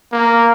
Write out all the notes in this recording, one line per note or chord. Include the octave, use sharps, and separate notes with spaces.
A#3